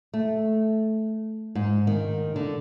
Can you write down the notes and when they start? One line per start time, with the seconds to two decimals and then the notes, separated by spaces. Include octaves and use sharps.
0.14 A3
1.55 G#2
1.87 D#3
2.36 D3